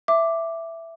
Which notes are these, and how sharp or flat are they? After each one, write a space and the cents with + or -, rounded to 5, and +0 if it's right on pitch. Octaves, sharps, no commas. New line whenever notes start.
E5 +5 D6 +0